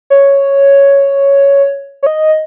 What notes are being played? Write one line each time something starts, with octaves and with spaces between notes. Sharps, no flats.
C#5
C#5
D#5